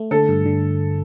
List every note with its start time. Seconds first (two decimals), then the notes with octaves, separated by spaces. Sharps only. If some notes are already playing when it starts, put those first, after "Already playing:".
Already playing: A3
0.11 D3 A4
0.29 G2
0.46 D3